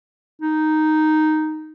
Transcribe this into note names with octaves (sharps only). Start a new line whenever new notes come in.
D#4